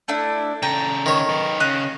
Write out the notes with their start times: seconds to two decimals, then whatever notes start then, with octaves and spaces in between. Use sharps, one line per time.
0.08 A3 D4 E4
0.63 C#3 A4 G5 A#5
1.06 D#3 C#5
1.29 D#4 B4
1.60 C#3 D#5 F#6